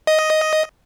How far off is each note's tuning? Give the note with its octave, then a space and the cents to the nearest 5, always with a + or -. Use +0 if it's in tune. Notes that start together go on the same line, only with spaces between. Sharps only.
D#5 +5